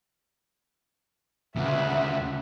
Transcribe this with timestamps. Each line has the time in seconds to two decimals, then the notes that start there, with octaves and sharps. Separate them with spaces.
1.56 D2 C#3 E5 F#5